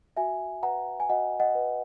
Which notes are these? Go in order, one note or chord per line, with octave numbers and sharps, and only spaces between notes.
F#4 E5 G#5
B4 F#5 A#5
G#5
F#4 D#5 F#5
D#5 F#5
B4